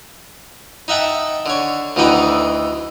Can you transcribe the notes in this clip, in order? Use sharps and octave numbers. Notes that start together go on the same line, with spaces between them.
D#4 E5 F#5 G5 A5
D3 C#5
D2 D3 E3 D#4 F#5 G5